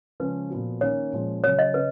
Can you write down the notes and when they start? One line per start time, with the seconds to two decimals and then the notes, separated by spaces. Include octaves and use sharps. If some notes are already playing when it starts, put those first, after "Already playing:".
0.20 C#3 F3 G#3 C#4 B4
0.50 A#2 F3 B3 F#4
0.81 D#3 A#3 C#4 C#5
1.13 A#2 F3 G#3 C#4
1.44 C#3 F#3 C#4 C#5
1.59 D#5
1.74 C#3 B4